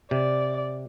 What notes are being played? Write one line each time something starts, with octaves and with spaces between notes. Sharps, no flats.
C3 D5